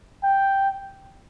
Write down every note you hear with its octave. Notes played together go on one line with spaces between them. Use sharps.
G5